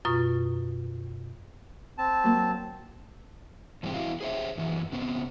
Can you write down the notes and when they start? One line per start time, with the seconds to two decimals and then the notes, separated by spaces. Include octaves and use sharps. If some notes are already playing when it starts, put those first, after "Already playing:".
0.05 F#2 B2 F4 C#6 D#6
1.98 C4 A5
2.23 F#3 A#3
3.83 G#2 E3 G3 G#3 C4 G4
3.94 E2 G2 E4 F#4 F5
4.21 G#4 C5 E5
4.58 F#2 E3 F#3
4.92 C#3 B3 C4